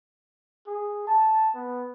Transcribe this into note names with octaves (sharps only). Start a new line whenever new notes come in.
G#4
A5
B3